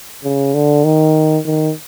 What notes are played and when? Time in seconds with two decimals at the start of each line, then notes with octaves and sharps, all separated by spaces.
0.24 C#3
0.54 D3
0.84 D#3
1.45 D#3